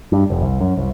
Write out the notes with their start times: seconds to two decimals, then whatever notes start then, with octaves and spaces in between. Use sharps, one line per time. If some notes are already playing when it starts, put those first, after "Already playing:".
0.12 G2
0.30 F1
0.42 C2
0.60 F#2
0.77 C2